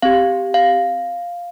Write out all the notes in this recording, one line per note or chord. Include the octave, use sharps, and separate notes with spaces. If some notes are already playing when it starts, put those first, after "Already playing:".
C4 G4 F5
F5